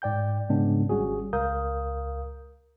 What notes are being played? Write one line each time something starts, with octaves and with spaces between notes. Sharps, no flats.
G#2 D5 G5 G6
G#2 C#3 G#3 B3 C#4 D4
G#1 G3 C#4 F#4 G#4
C#2 A#4 F5 D#6 G6